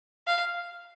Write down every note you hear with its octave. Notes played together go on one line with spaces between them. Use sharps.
F5